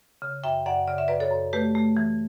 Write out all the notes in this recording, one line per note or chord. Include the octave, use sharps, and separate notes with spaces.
C#3
F#2 E5 G5
F#2 D5 F#5
C#3 D5
E5
F#2 B4 D5
A4 C#5
F#2
A3 G4 B4
A3
E3